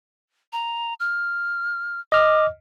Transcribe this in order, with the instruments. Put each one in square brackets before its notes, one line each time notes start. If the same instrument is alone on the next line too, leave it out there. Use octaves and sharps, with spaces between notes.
[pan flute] A#5
F6
[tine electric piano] D#5 F6 [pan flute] D6